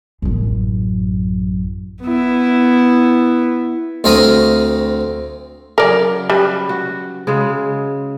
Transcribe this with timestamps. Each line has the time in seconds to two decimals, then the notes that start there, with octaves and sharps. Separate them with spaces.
0.22 A1 F#2
2.02 B3 E4
4.04 D2 C4 E5 F5 A#5 D#6
5.78 C#3 F#3 A#4 D5
6.30 G3 B4
6.69 F#4
7.27 C#3 G#3